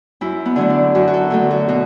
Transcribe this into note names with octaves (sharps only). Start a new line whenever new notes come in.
F#2 E4
B3
D3 F#3 A3
D4
F#2 F#4
F#4
A4
D3 F#3 A3 A4
F#4
B2 F#4